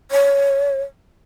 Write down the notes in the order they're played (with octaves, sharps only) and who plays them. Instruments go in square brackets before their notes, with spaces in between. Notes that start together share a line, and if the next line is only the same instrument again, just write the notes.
[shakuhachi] C#5